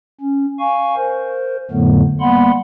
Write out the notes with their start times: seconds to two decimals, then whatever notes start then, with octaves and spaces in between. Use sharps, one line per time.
0.21 C#4
0.59 F5 G#5 C#6
0.96 A#4 C5
1.71 F2 A2 D3 F#3 A3 B3
2.20 G3 A#3 B3 F#5 B5 C6